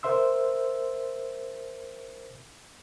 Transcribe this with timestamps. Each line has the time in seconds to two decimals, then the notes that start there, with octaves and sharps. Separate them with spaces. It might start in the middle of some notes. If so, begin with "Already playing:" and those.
0.03 A#4 C5 E5 C6 E6